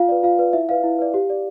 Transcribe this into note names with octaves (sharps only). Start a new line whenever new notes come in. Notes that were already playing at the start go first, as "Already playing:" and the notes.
Already playing: F4 F5
B4 D5
F4 F5
B4 D5
E4 E5
B4 D5 F5
E4
B4 D5
G4
D5